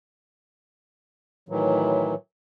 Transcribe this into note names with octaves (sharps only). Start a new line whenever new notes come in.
A2 D#3 E3 F#3